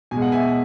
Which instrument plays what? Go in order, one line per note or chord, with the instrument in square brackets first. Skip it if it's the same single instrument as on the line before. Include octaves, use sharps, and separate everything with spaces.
[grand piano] B2 G#3 G#5
F#5
E5 G#5